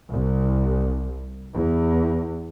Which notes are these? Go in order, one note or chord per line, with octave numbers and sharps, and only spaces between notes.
C2
E2